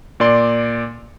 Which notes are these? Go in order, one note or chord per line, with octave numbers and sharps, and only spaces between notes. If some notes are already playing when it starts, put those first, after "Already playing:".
A#2 D5 C6